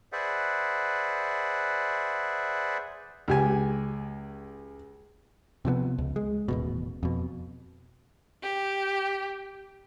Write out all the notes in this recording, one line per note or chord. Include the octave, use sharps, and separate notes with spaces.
G#4 B4 C5 D5 E5 F#5
C#2 G4 G#5
C3 F3 F#3 B3
C#2
G#3
D#1 A1 B2
F2 B2
G4